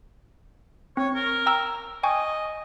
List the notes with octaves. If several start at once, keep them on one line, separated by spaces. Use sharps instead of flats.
C4 C#5
A#4
G5 A#5 E6
D#5 G5 G#5 C#6